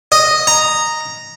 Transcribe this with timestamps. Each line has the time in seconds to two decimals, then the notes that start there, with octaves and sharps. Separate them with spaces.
0.12 D#5
0.47 A#5